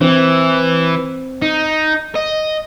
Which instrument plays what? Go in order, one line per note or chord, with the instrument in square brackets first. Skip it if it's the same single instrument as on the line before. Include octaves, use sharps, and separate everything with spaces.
[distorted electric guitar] E3 [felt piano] C4
[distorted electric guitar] D#4
D#5